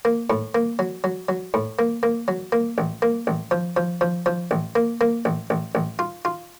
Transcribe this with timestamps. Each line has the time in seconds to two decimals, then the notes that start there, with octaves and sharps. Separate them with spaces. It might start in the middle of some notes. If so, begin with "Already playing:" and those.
0.05 A#3
0.30 A2
0.55 A#3
0.79 F#3
1.04 F#3
1.29 F#3
1.54 A2
1.79 A#3
2.03 A#3
2.28 F#3
2.52 A#3
2.78 A1
3.02 A#3
3.27 A1
3.51 F3
3.77 F3
4.01 F3
4.26 F3
4.51 A1
4.76 A#3
5.01 A#3
5.25 A1
5.50 A1
5.75 A1
5.99 F4
6.25 F4